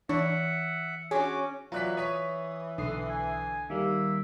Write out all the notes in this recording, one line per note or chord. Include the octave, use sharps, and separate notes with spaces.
E3 D4 E4 E5 F#5
C#4 D4 F#4 G#4 C#5 D6
E3 F#3 F4 D5 F#6 B6
C#5 C#6 D#6 B6
B1 D3 D#6 C7
G#5
D#3 G3 A#3 E5